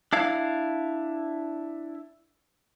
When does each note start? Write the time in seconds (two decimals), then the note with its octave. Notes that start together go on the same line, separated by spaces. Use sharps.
0.13 D4 E4 F5